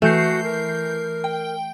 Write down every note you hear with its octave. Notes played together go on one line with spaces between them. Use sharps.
E3 A3 F#4 G6 C7
A#4
G5